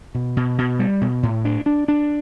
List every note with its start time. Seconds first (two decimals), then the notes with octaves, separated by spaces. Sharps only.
0.15 B2
0.37 B2
0.58 B2
0.79 G3
1.01 B2
1.23 A2
1.45 D4
1.66 D4
1.88 D4